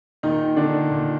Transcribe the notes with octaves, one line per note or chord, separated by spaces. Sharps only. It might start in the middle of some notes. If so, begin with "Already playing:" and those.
A#2 D#3 D#4
D3 D4
A#2